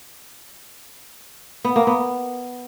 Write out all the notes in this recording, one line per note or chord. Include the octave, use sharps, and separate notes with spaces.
B3
A#3
B3